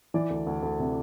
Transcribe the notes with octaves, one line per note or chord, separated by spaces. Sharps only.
E3 D5
D2
D2
D2
C3